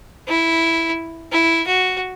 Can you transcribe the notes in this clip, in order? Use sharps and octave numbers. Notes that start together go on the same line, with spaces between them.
E4
E4
F#4